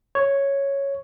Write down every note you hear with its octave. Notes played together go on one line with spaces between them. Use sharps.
C#5